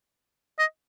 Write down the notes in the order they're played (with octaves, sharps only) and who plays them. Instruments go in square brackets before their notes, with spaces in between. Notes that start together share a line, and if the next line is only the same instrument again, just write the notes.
[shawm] D#5